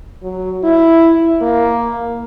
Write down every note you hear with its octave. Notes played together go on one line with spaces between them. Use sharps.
F#3
E4
A#3